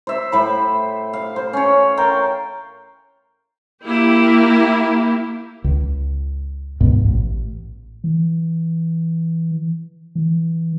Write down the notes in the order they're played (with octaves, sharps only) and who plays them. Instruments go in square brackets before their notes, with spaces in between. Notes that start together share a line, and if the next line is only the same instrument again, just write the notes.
[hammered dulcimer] C5 E5
A2 C5 B5
F5
C5
C#4 C#5
A#4 G5 A5 C6
[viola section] A#3 E4 G4
[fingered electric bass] C#2
C#2 G#2 B2
A1 A2
[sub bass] E3
E3